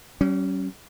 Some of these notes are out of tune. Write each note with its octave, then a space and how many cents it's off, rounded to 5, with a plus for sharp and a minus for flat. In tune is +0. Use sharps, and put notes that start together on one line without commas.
G3 -45 C#4 +0